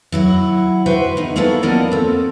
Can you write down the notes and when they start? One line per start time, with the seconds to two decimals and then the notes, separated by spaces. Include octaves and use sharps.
0.12 F#3 E4 F#4
0.86 F#4 B4 C5 E5 G5
1.17 E2 D#4
1.36 G#3 A#3 B3 E4 F#4 A4
1.63 F3 B3 C#4 A#4 D5 D#5
1.92 C4 A4